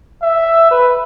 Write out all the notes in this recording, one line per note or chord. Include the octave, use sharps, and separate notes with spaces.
E5
B4